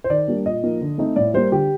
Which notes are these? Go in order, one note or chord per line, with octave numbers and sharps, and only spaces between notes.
C5
D#3 D5
G3 A#3 D4
A#2 D#5
F3 A#3 D#4
D3
A3 C4 D#4
A2 D5
G3 A#3 C5
D3 G4